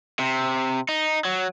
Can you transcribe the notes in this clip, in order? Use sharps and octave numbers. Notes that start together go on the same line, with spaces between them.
C3
D#4
F#3